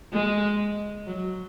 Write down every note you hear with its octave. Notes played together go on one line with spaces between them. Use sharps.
G#3
F#3